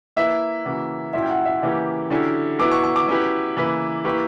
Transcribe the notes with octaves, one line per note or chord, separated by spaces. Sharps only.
A#3 E4 B4 E5
C#3 E3 A#3 C#4 F#4
A#2 F#3 C#4 E4 E5
G5
F#5
E5
C#3 E3 A#3 C#4 G4 E5
D3 F#3 C#4 E4 G4
F#3 B3 E4 D6
C#6
C#6
D6
F#3 C#4 E4 G4 B4
C#3 E3 A#3 E4 B4
A#3 E4 G4 B4 C#6